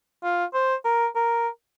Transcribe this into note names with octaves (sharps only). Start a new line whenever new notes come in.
F4
C5
A#4
A#4